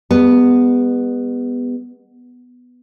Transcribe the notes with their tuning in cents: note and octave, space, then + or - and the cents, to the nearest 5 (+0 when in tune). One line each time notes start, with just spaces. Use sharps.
G#3 -45 B3 +0